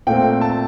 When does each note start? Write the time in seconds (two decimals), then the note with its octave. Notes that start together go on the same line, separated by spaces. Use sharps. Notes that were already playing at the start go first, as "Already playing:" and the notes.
0.07 A#2 A3 C4 G5
0.41 A5